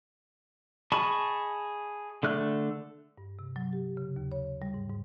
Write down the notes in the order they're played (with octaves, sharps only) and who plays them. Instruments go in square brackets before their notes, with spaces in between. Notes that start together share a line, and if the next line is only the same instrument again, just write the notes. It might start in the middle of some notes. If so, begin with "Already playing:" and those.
[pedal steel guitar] G#4 D#5 A5 B5 C#6
D3 A3 F#6
[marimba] G2
C3
F#3
G4
C#3
D#2
C#5
G3
G#2
G#2